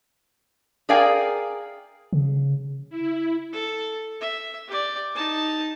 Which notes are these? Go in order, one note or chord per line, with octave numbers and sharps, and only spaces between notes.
G#4 A#4 D5 F5 G5 G#5
C#3
E4
A4
E5
G4 D5
D#4 A5